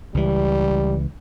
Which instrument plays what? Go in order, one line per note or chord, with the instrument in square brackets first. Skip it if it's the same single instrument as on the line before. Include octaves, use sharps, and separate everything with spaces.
[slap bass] C#2 E3 [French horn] G3